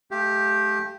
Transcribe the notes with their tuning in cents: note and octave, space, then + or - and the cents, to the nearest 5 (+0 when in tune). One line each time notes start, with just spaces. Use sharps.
A3 -30 G4 +0 F5 -35